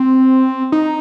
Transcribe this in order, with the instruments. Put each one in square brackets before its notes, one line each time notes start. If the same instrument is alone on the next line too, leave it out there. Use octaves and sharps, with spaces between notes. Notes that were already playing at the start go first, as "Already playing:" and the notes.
Already playing: [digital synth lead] C4
D#4